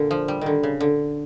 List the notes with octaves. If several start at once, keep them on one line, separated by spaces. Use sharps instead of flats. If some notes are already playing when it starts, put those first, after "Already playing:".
Already playing: A#2 D3
F3
G3
D3 D#3
C#3
D3